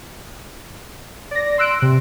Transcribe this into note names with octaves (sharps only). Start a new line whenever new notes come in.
D5 A#6
C6 E6 F#6 D7
C3